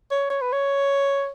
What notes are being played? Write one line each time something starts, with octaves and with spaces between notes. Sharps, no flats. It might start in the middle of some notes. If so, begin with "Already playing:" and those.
C#5
C#5
B4
C#5